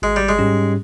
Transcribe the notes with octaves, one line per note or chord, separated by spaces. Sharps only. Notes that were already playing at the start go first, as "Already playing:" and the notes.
G#1 G#3
G3
G#3
G#2 G3 C#4 G4